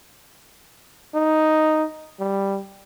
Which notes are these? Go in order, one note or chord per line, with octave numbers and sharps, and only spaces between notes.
D#4
G3